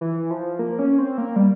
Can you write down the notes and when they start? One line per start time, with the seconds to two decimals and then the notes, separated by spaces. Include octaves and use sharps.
0.01 E3
0.31 F3
0.59 A#3
0.79 C#4
0.98 C4
1.18 A#3
1.36 G3